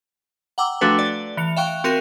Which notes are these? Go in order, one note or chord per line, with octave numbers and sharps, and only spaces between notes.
F#5 G5 A#5 D6 E6
F3 A3 D4 F#4 A4 B4
D5
E3 C#7 F7
E5 F5 G5 C#6 F#6 D7
C4 F#4 A#4 C6 D#7 E7